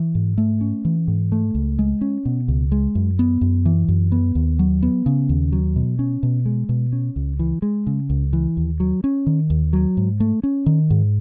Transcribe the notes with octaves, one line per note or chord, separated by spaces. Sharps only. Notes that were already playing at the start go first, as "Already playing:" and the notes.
Already playing: E3
G#2
A3
C#4
E3
G#2
A3
C#2
G#3
C#4
B2
C#2
G#3
F#2
B3
F#2
E3
F#2
B3
D#2
F#3
B3
C#3
D#2
F#3
B2
C#4
B2
G#3
B2
C#4
C#2
E3
G#3
C#3
C#2
E3
D#2
F#3
C#4
D#3
D#2
F#3
G#2
A3
C#4
D#3
G#2